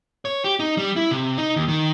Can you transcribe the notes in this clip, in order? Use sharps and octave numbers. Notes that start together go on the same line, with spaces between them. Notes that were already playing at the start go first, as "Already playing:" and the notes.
C#5
G4
D#4
G3
E4
C3
D#4
D#2
D#3